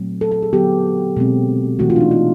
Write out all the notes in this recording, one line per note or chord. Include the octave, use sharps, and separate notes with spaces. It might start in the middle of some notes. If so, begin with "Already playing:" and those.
Already playing: A#2 F#3 A3 C4
A4
A4
G#4
D3 F#3 B3 G4
B2 G#3 C4
C3 E3 A3 F#4
F4
D4
D#4
F4